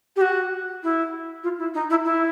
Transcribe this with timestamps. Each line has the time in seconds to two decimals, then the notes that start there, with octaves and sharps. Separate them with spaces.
0.16 G4
0.21 F#4
0.83 E4
1.43 F4
1.58 E4
1.74 D#4
1.90 E4
2.05 E4